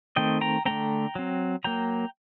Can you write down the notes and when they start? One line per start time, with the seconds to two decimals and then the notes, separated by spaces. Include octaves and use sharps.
0.16 D#3 A3 C4 D#5 G5
0.41 G5 A#5
0.65 D3 A3 C4 G5 A#5
1.15 F#3 C4
1.64 F#3 A#3 G5 A#5